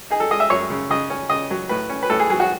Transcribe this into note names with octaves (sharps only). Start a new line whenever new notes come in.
D#4 G#4
A4
G#3 D#5
E5
F#2 C#5
C#3
C#3 D#5
C#4
C#3 D#5
F#3
A2 B4
C#4
B4
A2 A4
G#4
F#3 G#4
F#4